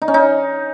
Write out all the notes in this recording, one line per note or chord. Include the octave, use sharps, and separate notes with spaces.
D#4
C#4
D#4